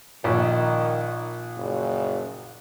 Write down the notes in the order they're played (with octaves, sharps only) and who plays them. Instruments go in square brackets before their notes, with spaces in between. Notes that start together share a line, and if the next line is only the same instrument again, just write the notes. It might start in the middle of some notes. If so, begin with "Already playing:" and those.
[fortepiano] A#1 [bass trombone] D#3
[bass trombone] F#1